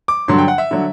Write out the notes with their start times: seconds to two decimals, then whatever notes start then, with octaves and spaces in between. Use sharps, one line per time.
0.08 D6
0.28 G2 D3 F#3 C6
0.38 G5
0.48 F#5
0.58 E5
0.71 D3 F#3